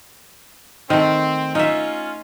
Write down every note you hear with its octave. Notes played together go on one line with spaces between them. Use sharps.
D#3 A3 C4
C#4 D#4 F4 E5